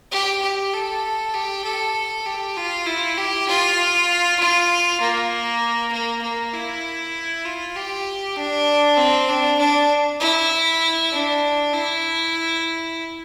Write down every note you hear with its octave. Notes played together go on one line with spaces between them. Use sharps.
G4
G4
A4
G4
A4
G4
F4
E4
G4
F4
F4
A#3
A#3
A#3
E4
F4
G4
D4
C4
D4
D4
E4
D4
E4